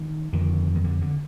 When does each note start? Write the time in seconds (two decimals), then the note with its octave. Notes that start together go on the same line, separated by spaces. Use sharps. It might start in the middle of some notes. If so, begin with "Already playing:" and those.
Already playing: D#3
0.33 F2 D3 D#3
0.75 D#3
0.84 D3
1.02 D3